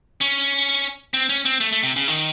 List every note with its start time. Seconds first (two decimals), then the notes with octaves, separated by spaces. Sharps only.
0.21 C#4
1.14 C4
1.29 C#4
1.45 C4
1.60 A3
1.72 A3
1.83 C3
1.96 C#3
2.08 D#3